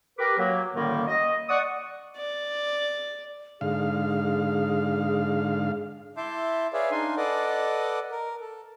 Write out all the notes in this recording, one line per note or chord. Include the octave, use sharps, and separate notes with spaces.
G4 A#4 B4 D6
F#3 A#3
F#2 A2 D3 D#3 G3 A#3
D#5
D5 F#5 C#6 D#6
D5
G#2 D3 G#4 F5
E4 E5 A5 C6 D6 G6
G#4 B4 C#5 D5 E5 F5
D4 D#4 F5 G#5 C6
A4 B4 D5 D#5 F#5 D6
A#4
A4